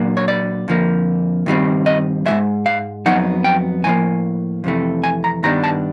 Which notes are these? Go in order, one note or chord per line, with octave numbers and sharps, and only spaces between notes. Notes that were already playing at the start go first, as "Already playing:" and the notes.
Already playing: A#2 F#3 A#3 D4
C#5
D5
F2 D3 F3 A#3
G2 D#3 G3 C4
D#5
G#2 F3 G#3 E5
F5
F2 D3 F#3 B3 D#4 F#5
G5
A2 F3 A#3 G#5
F2 C3 E3 A3
G#5
A#5
G2 D#3 G3 B3 D4 A#5
A5